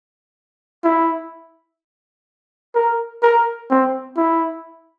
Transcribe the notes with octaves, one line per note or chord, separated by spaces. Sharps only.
E4
A#4
A#4
C4
E4